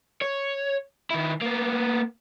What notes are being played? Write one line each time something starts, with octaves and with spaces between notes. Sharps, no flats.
C#5
D#3 E4
A#3 B3